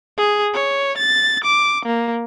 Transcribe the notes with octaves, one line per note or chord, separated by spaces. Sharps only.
G#4
C#5
A6
D6
A#3